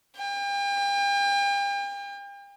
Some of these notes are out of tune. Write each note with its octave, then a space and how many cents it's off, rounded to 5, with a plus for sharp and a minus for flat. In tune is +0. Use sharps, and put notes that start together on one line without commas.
G5 +40